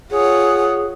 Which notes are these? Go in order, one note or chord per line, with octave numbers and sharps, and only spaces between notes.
F4 G#4 C#5 F#5